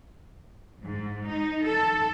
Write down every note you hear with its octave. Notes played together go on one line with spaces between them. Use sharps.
G#2
D#4
A4